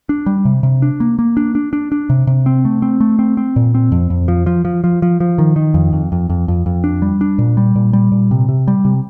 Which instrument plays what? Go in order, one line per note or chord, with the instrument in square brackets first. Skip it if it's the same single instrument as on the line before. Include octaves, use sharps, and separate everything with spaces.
[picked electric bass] D4
G3
C3
C3
D4
A#3
A#3
D4
D4
D4
D4
C3
C3
C4
A3
C4
A3
C4
C4
A#2
C4
F2
F2
F3
F3
F3
F3
F3
F3
D#3
D#3
F2
F2
F2
F2
F2
F2
D4
G3
D4
A#2
G3
A#2
G3
A#2
C3
C3
G3
C3